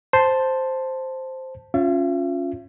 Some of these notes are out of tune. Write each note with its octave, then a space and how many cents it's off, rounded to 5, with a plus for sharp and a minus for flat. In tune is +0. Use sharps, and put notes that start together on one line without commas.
C5 +0 A5 +0
C#4 +0 F4 +15 E5 +40